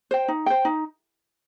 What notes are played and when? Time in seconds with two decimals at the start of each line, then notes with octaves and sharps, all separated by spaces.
0.11 C5 G5
0.28 D#4
0.46 C5 G5
0.65 D#4